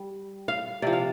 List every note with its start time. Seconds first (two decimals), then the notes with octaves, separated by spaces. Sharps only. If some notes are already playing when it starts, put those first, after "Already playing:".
Already playing: G3
0.48 F5
0.82 C3 F3 D5
0.93 F5